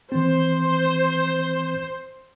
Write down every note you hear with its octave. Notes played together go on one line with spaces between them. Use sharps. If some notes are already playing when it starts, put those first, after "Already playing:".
E3 C4 C5